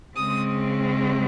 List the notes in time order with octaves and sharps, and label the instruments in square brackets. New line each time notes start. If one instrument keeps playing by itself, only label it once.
[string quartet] C#3 G#3 C4 D#6